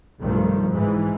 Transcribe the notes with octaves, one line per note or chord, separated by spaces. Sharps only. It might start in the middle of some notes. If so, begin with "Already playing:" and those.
F1 B1 G2 D#3 F3 A3
G#2 E3 G#3